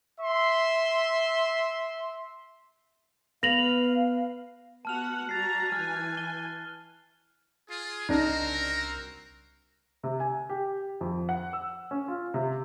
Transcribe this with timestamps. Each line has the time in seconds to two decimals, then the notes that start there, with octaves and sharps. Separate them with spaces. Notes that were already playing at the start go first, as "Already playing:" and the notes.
0.19 E5 C6
3.43 B3 B4 F5 A#6 F7 F#7
4.85 B3 F#4 F#5 A5 F6 F7
5.29 G3 F#4 A#5 A6 C7
5.72 E3 G#5 F6 F#6
6.17 G7
7.69 F4 G#4
8.09 C2 C#3 C4 D4 D#4 F#4 A#4
10.03 C3
10.20 G#5
10.49 G4
11.01 F2
11.29 F#5
11.53 E6
11.91 C#4
12.08 F4
12.34 C3